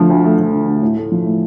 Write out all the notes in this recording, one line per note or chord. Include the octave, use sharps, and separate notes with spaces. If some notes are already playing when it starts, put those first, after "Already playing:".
Already playing: D3 F3 A3
D2
A3
F3
D3
D2
A2
A3
F3
A2